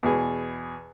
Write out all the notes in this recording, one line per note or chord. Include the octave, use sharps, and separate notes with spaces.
E2 B2 G#4